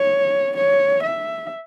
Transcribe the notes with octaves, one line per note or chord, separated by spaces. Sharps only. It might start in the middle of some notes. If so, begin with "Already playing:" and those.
Already playing: C#5
C#5
E5